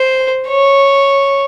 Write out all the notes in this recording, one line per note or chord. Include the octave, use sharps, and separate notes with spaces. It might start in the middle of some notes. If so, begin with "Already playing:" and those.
Already playing: C5
C#5